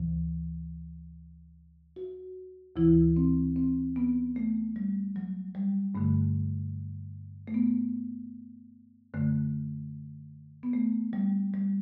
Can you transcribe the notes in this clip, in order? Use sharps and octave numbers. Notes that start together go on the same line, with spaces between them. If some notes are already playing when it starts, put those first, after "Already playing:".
Already playing: D2 C3 E3
F#4
D2 C3 E3 E4
C4
C4
B3
A3
G3
F#3
G3
G2 D3 A3
A3
B3
F#2 D3 A3
B3
A3
G3
G3